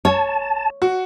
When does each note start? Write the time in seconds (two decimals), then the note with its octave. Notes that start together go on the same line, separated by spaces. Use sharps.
0.05 C#5 A5
0.82 F#4